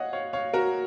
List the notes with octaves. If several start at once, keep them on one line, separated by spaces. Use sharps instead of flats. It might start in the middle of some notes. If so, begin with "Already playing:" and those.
Already playing: C#5 D#5 F5 F#5
C#5 F5
C#5 F5
F#4 A#4